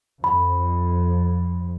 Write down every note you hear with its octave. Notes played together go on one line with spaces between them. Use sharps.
F2 B5